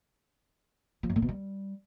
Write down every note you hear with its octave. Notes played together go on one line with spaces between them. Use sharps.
F3
F#2
A2
B2
G3